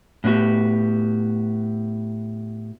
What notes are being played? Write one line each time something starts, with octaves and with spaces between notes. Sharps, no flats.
A2 B3 C#4 F#4 G4